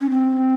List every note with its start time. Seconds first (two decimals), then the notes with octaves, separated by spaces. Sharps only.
0.01 C#4
0.10 C4